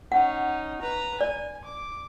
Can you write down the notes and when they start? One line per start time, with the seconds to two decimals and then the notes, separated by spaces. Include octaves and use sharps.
0.12 C#4 D#4 F#5
0.81 B4 A#5
1.21 D5 G#5
1.64 D6